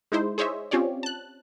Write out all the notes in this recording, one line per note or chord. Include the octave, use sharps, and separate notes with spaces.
G#3 D#4 E4 C5
G#4 C5 C#5 D#5 E5
C4 C#4 F4 G4 C#5 D5
A5 F#6